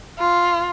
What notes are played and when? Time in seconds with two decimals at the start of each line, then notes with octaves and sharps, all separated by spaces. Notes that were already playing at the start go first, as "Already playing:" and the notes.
0.19 F4